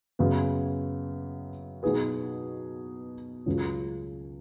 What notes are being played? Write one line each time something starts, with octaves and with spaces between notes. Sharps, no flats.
F#2 C#3 B3
B2 F#3 D#4 G#4 B4
C#2 C#3 F#3 C#4